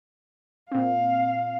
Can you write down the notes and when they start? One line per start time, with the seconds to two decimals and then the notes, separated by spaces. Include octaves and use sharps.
0.71 A#2 C4 F5